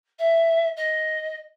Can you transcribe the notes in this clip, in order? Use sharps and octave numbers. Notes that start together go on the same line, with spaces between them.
E5
D#5